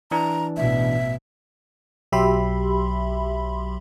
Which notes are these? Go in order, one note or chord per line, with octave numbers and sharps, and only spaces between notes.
E3 D4 A#5
A1 B2 E5
B1 F#3 G4 E5 B5 C6